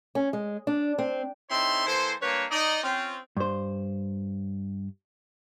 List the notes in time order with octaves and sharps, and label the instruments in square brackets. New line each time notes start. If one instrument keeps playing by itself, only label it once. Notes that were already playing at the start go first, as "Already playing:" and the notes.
[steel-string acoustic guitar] C#4
G#3
D4
C4
[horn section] C4 D#4 E4 A4 C#5 C6
E3 A#3 A4 C5
G2 A#3 B4 C#5
D#4 D5 D#5
C4 C#4 F4
[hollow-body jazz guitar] G2 C5